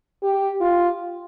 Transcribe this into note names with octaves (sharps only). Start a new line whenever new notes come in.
G4
F4